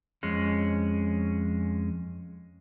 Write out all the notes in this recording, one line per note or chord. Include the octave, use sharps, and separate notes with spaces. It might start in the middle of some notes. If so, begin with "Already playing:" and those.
F2 G#3 C#4